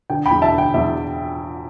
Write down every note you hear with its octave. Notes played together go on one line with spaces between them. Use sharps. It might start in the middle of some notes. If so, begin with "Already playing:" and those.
D3 G5
G5 B5
E2
E5 A5
D3
G5
E2 E5